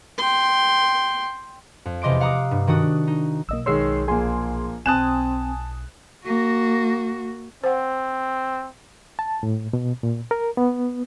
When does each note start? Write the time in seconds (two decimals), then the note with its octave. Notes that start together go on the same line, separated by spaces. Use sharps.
0.18 G5 C6
1.85 F2
2.02 E2 C3 D#5 C6 D6 D7
2.20 F5 F#5 A#5 D6 D#6
2.51 G2
2.67 D#3 D4 F#4 D#6
3.07 D#4
3.49 B1 A#3 D#5 E6
3.66 D#3 G#3 C#5 C6 E6 C7
4.08 A#1 A#3 G#4 G#5 C6
4.86 B1 C4 G#5 A5 D#6 F#6 E7
6.25 A#3 F#4
7.64 C4 C5 F#5
9.19 A5
9.43 A2
9.73 B2
10.03 A#2
10.31 A#4
10.57 B3